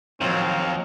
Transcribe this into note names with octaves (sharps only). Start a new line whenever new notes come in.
D#2 F3 F#3 C4 C#5 F5 A#5